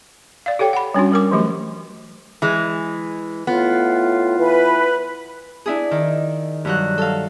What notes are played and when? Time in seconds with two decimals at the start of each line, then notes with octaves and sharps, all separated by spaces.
0.46 D5 F5
0.59 G4 A4 C#5 G5
0.73 F#5 B5
0.94 G3 C#4 D4 F#4
1.12 G3 A#4 D6
1.31 E3 F#3 A3 G4
2.42 E3 G#3
3.47 A2 B3 F4
4.38 E3 B4
5.66 D4 E4 G#4
5.91 D#3
6.65 G2 F#3 F#6
6.98 A4 F5